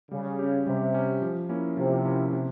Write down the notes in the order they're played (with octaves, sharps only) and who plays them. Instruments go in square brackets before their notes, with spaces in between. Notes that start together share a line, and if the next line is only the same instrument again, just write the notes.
[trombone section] C#3 [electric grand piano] G3
[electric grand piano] C#4 G4
[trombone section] C3 [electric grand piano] G3
[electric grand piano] C#4 G4
F3
A#3 C#4 E4
[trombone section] C3 [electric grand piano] F3
[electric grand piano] A#3 C#4 E4
C3